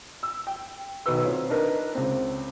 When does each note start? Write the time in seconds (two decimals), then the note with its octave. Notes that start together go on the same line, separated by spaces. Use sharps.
0.23 E6
0.47 G5
1.06 B1 D#3 F#4 B4 E6
1.24 C4 F4 C#5
1.50 D4 D#4 A#4 B4
1.95 C#2 C4